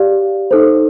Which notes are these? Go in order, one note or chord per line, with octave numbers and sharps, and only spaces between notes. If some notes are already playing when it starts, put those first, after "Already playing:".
Already playing: G4 D5 F5
D#4 A4 C5